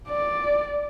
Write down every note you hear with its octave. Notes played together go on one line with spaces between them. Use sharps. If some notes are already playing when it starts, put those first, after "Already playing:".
D5